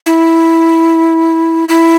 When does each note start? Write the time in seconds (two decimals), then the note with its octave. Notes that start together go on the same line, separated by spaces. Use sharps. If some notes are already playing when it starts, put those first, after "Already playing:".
0.06 E4
1.69 E4